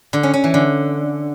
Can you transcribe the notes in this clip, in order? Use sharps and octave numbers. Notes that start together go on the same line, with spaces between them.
D3
C#4
C#4
E3
D3